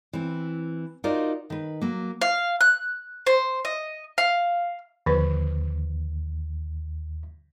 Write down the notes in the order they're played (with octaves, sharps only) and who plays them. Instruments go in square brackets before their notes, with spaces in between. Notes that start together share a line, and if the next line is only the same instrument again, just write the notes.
[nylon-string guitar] E3 C4
D#4 F4 F#4 A#4 C5 D5
D#3 B4
F#3 A#3
[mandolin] F5
F#6
C5
D#5
F5
[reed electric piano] D#2 [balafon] D3 F3 B4